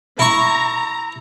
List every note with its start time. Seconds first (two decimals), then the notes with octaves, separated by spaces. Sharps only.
0.19 E4 A#5 C#6